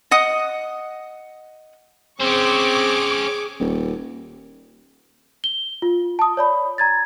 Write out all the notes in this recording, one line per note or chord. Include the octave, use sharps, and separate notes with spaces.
D#5 F#5 D#6
C4 C#4 G#4 C5 C#6 D6
D#1
G7
F4
A5 D#6
C#5 D5 B5
A#5 G#6 A6